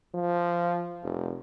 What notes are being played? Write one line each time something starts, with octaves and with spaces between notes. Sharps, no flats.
F3
F1